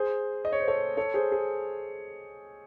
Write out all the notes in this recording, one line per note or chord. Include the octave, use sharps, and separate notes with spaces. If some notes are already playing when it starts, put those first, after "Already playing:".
Already playing: G#4 C5
D#5
C#5
C5
A4 C#5
A4 C#5
G#4 C5
G#4